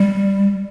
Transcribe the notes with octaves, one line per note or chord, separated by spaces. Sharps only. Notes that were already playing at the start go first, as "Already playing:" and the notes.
Already playing: G3